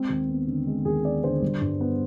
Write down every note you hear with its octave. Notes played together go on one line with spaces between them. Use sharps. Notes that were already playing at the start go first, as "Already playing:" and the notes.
Already playing: G#3 C4
D#2
B3
D3
G#3
D#2 G#4
B3 D5
D3 C5
G3
G2
B3